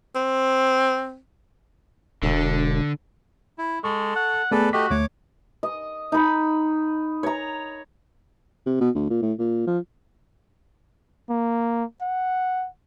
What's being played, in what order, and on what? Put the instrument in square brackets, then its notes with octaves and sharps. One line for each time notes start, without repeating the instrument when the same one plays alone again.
[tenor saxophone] C4
[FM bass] E1 [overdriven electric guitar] D3
[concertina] E4
[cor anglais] G#3 [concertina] A4 [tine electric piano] C#6
[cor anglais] F#5
[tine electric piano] A3 B3 G#4 [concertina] A4 B4 D5
[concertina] A3 G4 D#5 [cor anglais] F#4 [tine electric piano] B6
[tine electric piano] D2 A3 [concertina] C#5 D6
[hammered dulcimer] D#5
D#4 B5
C#5 A#5
[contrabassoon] C3
B2
D2
A#2
A2
A#2
F3
[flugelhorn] A#3
F#5